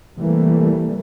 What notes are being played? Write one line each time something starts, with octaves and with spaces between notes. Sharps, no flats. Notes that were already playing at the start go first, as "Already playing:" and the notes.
C3 E3 G3 A3 A#3